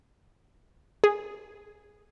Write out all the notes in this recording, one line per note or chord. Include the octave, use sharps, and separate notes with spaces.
G#4